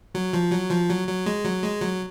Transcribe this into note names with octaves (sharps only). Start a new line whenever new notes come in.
F#3
F3
F#3
F3
F#3
F#3
G#3
F#3
G#3
F#3